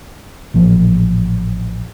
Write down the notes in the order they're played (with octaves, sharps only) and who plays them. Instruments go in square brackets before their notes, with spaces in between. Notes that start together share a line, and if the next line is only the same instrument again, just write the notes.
[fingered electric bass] A1 A#2 F3